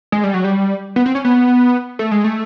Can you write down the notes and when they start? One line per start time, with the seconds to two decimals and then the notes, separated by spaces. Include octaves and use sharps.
0.12 G#3
0.24 G3
0.34 F#3
0.44 G3
0.96 B3
1.06 C4
1.15 C#4
1.25 B3
1.99 A3
2.11 G#3
2.24 A3